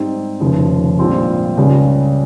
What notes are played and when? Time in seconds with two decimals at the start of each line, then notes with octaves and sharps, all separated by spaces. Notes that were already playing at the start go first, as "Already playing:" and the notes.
Already playing: G#2 G3 C4 D#4
0.40 F1 D#2 C#3 F3
0.99 A#1 G#2 G3 C4 F4
1.57 C#2 C#3 G3